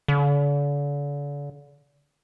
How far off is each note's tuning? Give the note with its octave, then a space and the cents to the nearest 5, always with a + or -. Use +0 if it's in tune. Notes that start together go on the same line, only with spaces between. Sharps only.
D3 -40